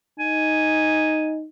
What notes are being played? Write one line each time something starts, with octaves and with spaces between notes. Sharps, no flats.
D#4 G#5